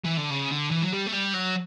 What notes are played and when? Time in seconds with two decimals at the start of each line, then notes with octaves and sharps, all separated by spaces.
0.05 E3
0.18 D3
0.31 C#3
0.51 D3
0.71 E3
0.82 F#3
0.92 G3
1.06 A3
1.12 G3
1.33 F#3